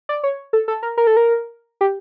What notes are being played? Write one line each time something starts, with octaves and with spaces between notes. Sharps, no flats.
D5
C#5
A4
A4
A#4
A#4
A4
A#4
G4